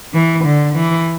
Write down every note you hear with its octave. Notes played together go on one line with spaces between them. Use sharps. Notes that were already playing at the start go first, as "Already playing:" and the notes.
E3
D3
E3